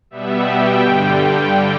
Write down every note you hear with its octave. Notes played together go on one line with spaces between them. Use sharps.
B2 G3 B3 E5
G5
G2 D3 G3